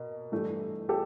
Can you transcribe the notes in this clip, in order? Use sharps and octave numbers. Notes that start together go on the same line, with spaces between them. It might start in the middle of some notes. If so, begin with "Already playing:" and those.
Already playing: B2 A#3
G2 E3 A3
G4 A4